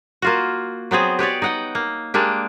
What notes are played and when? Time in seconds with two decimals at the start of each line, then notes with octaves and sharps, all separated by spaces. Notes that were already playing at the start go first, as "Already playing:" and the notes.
0.22 A#3 F4 F#4
0.91 F#3 B3 C4 G#4
1.19 G4 B4 C#5 D5
1.42 D#4 F#5 G5
1.75 A#3
2.14 G#3 A#3 D4 G4